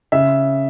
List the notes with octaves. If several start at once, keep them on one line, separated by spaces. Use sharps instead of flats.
C#3 E5